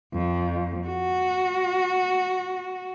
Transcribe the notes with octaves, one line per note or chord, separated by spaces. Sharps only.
F2
F#4